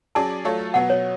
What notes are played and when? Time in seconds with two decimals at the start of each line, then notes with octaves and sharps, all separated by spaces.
0.15 F#3 C#4 G#4 D5 A5
0.45 F#3 A3 F4 A4 C#5
0.74 B2 F#3 B3 F#5
0.90 C#5